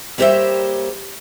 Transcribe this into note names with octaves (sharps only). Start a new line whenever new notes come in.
G3 A#3 G4 C5 C#5 E5